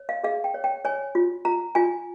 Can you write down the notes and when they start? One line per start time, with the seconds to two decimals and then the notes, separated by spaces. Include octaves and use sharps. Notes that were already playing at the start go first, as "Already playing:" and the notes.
Already playing: C#5
0.09 F5
0.23 G#4 F5
0.44 G5
0.54 C#5
0.64 G5
0.85 C#5 G#5
1.15 F4
1.45 F4 A#5
1.75 F4 G#5